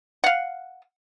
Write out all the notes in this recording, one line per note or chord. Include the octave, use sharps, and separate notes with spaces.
F5 F#5